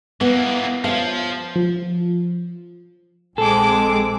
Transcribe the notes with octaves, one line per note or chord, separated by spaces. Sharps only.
E3 A#3 B3
F3 C#5 F5
F3
A#1 G#3 C4 G#4 A4 D6